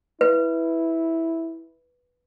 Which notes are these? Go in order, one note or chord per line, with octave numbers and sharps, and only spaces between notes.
E4 B4